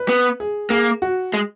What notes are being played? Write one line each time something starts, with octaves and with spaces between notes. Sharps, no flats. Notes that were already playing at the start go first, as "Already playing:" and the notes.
Already playing: B4
B3
G#4
A#3 G#4
F#4
G#3